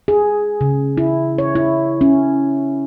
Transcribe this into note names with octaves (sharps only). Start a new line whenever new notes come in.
G#4
C#3
E4
C#5
E4
C#4